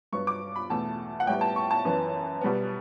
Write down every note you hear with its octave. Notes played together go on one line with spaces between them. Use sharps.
G2 F#3 B3 C#6
D6
B5
E2 B2 A3 A5
F#5
A2 G3 B3 G5
A5
C#6
A5
F#2 E3 B3
B2 G3 B3